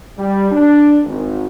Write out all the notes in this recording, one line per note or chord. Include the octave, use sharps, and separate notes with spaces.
G3
D4
G#1